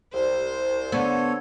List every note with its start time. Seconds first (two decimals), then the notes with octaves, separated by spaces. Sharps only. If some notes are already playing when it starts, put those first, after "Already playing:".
0.14 C2 C5
0.92 D3 B3 A4 C#5